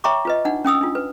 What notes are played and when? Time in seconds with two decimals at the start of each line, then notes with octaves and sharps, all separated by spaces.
0.04 C#5 E5 G5 A#5 C#6 D6
0.25 F4 B4 D#5
0.45 D4 D#4 F#5
0.64 C#4 G5 D#6 E6
0.81 D4 F4
0.95 B4